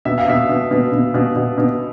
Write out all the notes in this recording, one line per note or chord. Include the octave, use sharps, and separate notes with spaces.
B2 E5
F5
B2 E5
B2
B2
B2
B2
B2
B2